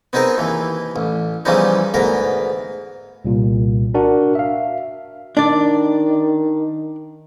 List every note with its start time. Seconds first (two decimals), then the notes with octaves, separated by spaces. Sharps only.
0.13 B3 C4 D#4 G#4 A#4
0.38 D#2 E3
0.96 A1
1.45 C#3 E3 F3 G3 B3 D#4
1.94 D2 G#2 B3 A#4
3.25 C2 A#2
3.94 D4 F#4 A#4 F#5
4.35 E5 F5
5.37 D#3 D4 D5